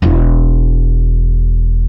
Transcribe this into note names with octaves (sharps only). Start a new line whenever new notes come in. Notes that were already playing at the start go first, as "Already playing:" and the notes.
E1 E4